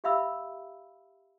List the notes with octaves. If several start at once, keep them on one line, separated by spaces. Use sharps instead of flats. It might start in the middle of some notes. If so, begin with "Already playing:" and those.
G4 E5 F5 B5 E6